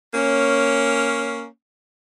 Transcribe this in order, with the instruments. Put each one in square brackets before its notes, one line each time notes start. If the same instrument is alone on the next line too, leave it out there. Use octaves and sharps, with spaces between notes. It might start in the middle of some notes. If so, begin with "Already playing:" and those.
[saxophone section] A#3 C#4